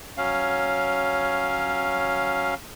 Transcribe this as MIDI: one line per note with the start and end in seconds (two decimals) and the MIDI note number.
0.17 2.54 54
0.17 2.54 61
0.17 2.54 77